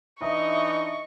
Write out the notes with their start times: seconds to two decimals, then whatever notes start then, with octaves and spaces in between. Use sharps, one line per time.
0.21 E3 D4 D#4 D#5 E5 C#6 D#6